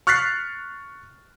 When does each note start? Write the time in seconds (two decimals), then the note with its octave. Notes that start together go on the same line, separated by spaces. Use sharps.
0.07 C#6 F6 F#6 A6 B6 C7